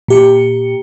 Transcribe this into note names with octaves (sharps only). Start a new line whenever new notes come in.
A#2 G4 C#7